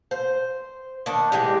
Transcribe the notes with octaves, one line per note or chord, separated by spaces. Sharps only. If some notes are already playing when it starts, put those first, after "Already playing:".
C5
D#3 D4
E3 G#3 G4